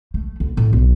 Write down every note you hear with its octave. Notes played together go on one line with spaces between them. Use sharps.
A3
D2
A2
B1